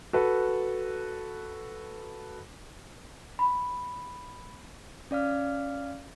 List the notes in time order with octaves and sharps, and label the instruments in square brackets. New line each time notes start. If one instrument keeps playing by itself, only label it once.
[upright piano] F#4 A4 B4
[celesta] B5
[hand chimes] C#4 D5 F5 F6